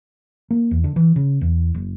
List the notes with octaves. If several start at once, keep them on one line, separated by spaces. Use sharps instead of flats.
A#3
E2
D3
E3
C#3
E2
F#1